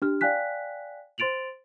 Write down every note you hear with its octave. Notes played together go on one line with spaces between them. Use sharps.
D4 G4 F6
D5 F5 G5 G#5 F#6 B6
C5 C6 A6 D7 F7 F#7